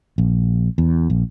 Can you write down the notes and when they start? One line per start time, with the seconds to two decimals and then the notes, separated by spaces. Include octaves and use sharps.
0.18 A#1
0.78 E2
1.10 A#1